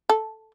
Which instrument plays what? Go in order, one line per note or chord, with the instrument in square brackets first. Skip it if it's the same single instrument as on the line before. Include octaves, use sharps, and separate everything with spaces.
[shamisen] A4